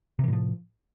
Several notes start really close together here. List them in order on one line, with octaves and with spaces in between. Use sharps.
C3 E3 A2 F3